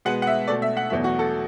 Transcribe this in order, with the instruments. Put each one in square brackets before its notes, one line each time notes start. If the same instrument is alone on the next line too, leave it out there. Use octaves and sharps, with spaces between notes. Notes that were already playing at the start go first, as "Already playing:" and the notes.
[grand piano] B2 G#3 B3 F#5
F#5
E5
B2 A3 D5
E5
F#5
E2 B2 F#3 A3 E5
F#4
A4